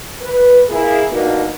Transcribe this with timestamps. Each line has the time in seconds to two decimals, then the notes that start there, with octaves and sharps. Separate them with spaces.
0.21 B4
0.69 A#3 E4 G#4
1.11 G2 B2 A#3 D4 D#4 F#4